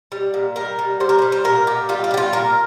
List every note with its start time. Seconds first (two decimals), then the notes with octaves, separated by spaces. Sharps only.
0.12 G3
0.34 A#2
0.56 G3 A#4
0.79 G3
1.00 G3 C5
1.09 A#4
1.19 G3 C5
1.32 C5
1.44 A#2 A#4
1.67 A#2 G4
1.89 G3 F4
2.04 D4
2.11 G3 G4
2.17 F4
2.33 A#2 A#4